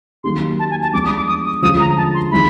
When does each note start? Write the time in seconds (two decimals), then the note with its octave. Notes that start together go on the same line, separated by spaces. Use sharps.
0.24 D#3 F#3 A#3 D#4 G4 C6
0.59 A5
0.70 G#5
0.82 A5
0.93 F3 G#3 B3 D4 D6
1.05 D#6
1.17 D6
1.28 D#6
1.45 D#6
1.62 D3 F3 G#3 C#4 F4 D#6
1.80 A#5
1.97 A5
2.14 C6
2.31 D#3 G#3 C4 E4 B5